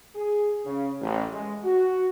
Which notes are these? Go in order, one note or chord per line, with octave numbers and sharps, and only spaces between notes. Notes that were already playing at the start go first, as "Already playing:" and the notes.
G#4
C#3
A1
G#3
F#4